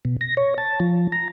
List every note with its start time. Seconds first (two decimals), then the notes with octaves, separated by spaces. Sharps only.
0.05 B2
0.21 A#6
0.37 C#5
0.58 A5
0.80 F3
1.12 A#5